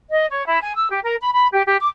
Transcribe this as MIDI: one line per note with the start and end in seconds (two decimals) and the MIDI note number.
0.10 0.25 75
0.30 0.45 73
0.46 0.61 64
0.62 0.72 80
0.76 0.85 88
0.90 0.99 67
1.04 1.16 70
1.21 1.30 83
1.34 1.47 83
1.53 1.62 67
1.66 1.77 67
1.81 1.89 86